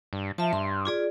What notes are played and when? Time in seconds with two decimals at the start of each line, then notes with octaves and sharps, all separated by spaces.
0.13 G2
0.38 F3 E5 A5
0.53 G2 C6
0.85 F4 G#4 D5